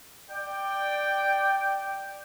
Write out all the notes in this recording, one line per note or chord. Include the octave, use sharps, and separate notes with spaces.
D5 G5